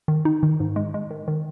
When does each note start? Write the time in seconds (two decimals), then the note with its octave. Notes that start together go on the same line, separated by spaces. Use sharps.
0.08 D#3
0.25 D#4
0.43 D#3
0.60 G#2
0.76 G#3
0.94 G#3
1.11 D#3
1.28 D#3